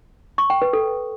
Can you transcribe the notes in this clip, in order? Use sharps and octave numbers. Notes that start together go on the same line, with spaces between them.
C#6
G5
B4
A4